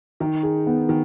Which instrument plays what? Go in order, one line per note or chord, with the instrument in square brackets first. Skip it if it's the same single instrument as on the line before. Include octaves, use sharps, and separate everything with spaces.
[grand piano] D#3 [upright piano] D#4
[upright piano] G#4
B3
[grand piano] D#3